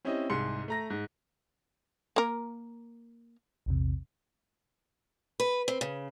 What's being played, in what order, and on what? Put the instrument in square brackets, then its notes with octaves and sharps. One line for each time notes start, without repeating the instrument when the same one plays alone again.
[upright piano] C4 C#4 E4 G4 D#5
C2 G#2 G#4 C6 C#7
A3 A#5 A#6
G#2
[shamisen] A#3 A#4
[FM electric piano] A#1 E2 C3
[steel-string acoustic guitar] B4
C4
C#3